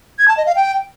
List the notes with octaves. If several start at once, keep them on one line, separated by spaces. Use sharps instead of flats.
G#6
A5
D#5
F5
G5